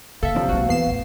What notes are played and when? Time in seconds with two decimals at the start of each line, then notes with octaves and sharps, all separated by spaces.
0.23 D3 A#3 A4 E5 F5
0.36 C3 F3 D4
0.49 B1 G#3 A#3 F#4
0.69 E2 B3 C7 E7
0.87 A1